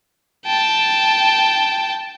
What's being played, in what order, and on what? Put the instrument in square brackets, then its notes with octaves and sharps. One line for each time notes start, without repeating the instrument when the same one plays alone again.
[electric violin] G5 A5